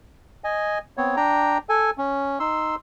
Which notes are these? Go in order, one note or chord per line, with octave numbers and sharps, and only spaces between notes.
D#5 G#5
B3 C4 C#5
D4 G5 A#5
A4 G#5
C#4
D#4 C6 E6